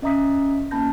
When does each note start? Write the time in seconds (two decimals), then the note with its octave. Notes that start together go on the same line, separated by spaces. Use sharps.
0.02 C#4 D#5 E5 A#5 D#6 B6
0.71 A#3 C#4 A5 B5 G6 A#6